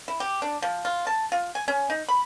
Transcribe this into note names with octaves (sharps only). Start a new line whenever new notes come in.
E4
G4
D4
F3
F4
A5
F4
G#5
C#4
D#4
B5